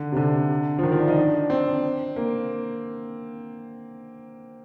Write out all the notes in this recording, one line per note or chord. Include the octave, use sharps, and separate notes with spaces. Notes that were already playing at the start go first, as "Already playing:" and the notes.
Already playing: D3
C3
D3
F3
D#3
F3
D4
D#4
D4
C4
A#3